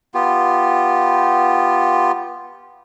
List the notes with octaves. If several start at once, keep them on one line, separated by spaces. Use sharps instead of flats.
B3 F4 G4